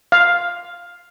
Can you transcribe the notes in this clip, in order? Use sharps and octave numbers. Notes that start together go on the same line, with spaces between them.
F5